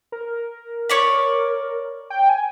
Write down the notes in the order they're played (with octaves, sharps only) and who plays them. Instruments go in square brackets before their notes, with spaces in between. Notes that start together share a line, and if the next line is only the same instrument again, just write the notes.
[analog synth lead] A#4
[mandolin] C#5 D5 B5
[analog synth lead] G5
G#5